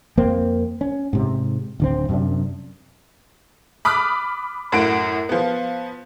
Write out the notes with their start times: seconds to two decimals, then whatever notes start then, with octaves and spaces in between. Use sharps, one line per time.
0.17 F2 A#3 C4
0.81 C#4
1.13 G#2 C3
1.80 D1 D3 C4
2.09 F#2 C3 D4
3.85 B5 D6 D#6 F6 F#6
4.72 F#2 A2 F#5 D7
5.29 F3 B3